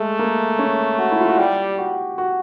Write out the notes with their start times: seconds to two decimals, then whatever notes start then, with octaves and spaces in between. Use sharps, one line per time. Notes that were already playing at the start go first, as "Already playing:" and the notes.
Already playing: G#3 A3
0.19 A#3
0.59 C#4
0.98 F#4
1.12 E4
1.21 F4
1.29 F#4
1.39 G3 G4
1.78 F#4
2.18 F#4